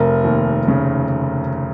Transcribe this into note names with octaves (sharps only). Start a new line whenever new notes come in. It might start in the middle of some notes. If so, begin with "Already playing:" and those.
Already playing: F1 A#4
D#2
C#3